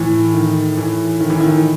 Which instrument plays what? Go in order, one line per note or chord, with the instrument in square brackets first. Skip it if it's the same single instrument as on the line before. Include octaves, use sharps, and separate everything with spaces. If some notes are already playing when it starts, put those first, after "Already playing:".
Already playing: [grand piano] A2 [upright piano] E3
[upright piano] D#3
E3
D#3
E3
D#3